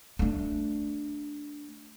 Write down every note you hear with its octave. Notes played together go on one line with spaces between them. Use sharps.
A3 D4